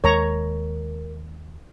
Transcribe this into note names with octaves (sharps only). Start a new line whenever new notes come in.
D#2 G#3 A#4 C#5 A#5